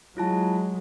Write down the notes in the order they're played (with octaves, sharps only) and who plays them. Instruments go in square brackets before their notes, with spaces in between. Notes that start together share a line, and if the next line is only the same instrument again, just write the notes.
[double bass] F#3 G#3 [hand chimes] E4 F4 A5